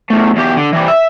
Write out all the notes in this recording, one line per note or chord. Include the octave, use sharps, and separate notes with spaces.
E2 A3
E2 G4
D3
E3 G3
E5